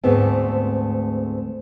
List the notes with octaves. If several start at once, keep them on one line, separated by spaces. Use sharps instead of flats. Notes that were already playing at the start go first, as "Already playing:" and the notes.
D2 G#2 A3 B3 C4